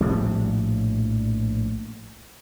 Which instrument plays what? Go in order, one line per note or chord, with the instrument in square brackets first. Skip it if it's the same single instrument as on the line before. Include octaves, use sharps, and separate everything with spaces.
[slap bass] A#1 A2 F3 G3